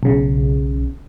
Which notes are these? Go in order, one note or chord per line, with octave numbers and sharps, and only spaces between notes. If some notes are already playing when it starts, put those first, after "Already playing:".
B1 C#3